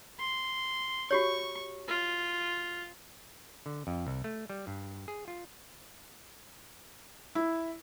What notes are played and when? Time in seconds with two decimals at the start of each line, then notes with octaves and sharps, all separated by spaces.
0.19 C6
1.11 F#4 G4 C#5 C#6
1.88 F4
3.66 D3
3.87 F2
4.07 C2
4.24 A3
4.50 G3
4.67 G2
5.08 G#4
5.28 F4
7.35 E4